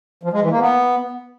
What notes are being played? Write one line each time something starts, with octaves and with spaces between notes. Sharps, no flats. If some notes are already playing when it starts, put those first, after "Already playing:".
F3
G#3
E3
A#3
B3